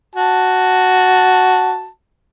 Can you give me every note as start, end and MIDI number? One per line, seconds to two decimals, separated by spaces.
0.15 1.88 66
0.15 1.88 81